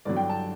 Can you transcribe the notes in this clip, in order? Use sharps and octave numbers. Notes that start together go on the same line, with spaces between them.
G2 D3 F#3 D5
G5
A5